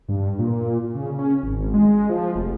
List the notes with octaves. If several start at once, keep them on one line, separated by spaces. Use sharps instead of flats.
G2
A#2
C#3
C#4
G#1
G#3
F3
F1